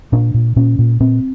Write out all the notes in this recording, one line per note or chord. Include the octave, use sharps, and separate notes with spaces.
A#2 D4
A#2
A#2 C#4
A#2
A#2 C4